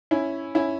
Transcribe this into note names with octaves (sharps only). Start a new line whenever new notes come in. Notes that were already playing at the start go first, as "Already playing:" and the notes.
C#4 E4
C#4 E4